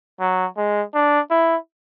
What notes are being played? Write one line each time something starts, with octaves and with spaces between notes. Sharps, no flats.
F#3
G#3
D4
E4